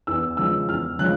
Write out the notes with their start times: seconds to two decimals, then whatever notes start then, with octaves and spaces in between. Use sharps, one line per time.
0.07 E2 E6
0.37 C#3 F3 G#3 E6
0.68 E2 F6
0.99 C#3 F3 G#3 F#6